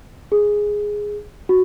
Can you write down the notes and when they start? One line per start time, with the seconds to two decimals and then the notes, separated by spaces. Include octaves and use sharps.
0.32 G#4
1.49 F#4